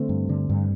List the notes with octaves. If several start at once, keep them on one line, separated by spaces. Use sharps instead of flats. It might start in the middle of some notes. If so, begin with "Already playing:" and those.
Already playing: D3 A3 C4
G2
D3
G2